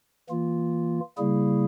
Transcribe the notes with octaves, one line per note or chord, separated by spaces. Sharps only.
E3 A#3 F4
C#3 G3 A#3 E4 G#4